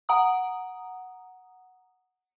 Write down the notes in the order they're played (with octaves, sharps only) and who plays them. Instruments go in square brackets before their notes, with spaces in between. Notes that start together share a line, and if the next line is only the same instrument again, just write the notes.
[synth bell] F#5 A#5 D#6